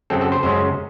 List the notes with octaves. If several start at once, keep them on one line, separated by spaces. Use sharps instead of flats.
F#2 C#3 F#3 C4 A4
A4
C5
F#2 C#3 G#3 C#4 C5